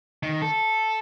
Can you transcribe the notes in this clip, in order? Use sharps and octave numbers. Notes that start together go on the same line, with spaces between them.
D#3
A4